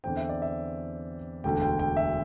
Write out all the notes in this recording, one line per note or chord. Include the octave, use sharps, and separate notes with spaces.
E2 D3 C4 G5
E5
D5
E5
E1 D2 D3 G5
G5
G5
E5